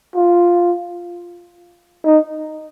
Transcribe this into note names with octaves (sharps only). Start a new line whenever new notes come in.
F4
D#4